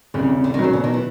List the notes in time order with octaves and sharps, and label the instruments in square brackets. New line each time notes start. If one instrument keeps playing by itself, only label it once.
[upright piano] C2 [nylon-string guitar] C#3
[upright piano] C2
[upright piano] C2 [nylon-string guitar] D3
[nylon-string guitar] D#3
[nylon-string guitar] C#3 [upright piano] F#3
[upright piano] B2 [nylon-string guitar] D3
[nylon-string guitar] D#3
E3